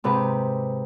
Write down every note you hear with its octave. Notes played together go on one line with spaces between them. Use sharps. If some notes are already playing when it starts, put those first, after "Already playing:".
G#2 C3 B4